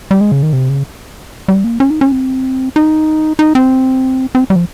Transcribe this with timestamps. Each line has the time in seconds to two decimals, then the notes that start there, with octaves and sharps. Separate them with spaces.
0.11 G3
0.21 G#3
0.32 C#3
0.43 D#3
0.53 C3
0.69 C#3
1.48 G3
1.64 A#3
1.80 C#4
1.90 D#4
2.01 C#4
2.12 C4
2.76 D#4
3.39 D#4
3.55 C4
4.35 C4
4.50 G3
4.56 F3